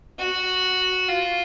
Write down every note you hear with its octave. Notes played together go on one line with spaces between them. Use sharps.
F#4
F4